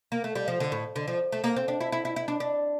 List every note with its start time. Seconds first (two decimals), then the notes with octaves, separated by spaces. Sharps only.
0.12 A#3
0.24 A3
0.35 G3
0.48 F3
0.60 D3
0.72 A2
0.96 D3
1.08 F3
1.32 A3
1.44 A#3
1.56 C4
1.68 D4
1.81 E4
1.92 E4
2.05 E4
2.16 E4
2.28 D4
2.40 D4